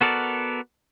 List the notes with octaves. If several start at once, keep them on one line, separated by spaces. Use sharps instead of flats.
B3 F#4 A4 A#4 D5